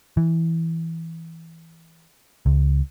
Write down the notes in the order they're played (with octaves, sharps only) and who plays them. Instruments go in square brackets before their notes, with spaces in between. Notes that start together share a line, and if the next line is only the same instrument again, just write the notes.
[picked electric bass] E3
C#2